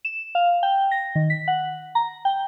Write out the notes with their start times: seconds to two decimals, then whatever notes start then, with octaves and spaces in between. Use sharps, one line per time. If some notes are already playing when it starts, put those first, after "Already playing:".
0.05 E7
0.35 F5
0.63 G5
0.91 A#6
1.15 D#3
1.30 B6
1.48 F#5
1.95 A#5
2.25 G5